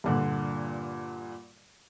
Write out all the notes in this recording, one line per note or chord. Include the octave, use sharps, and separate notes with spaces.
G2 A#2 D3